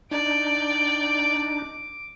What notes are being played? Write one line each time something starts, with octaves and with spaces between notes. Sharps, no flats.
D4 D#4 D5 G5 D6